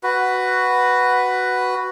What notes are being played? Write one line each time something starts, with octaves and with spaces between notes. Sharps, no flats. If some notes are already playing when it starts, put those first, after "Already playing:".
F#4 B4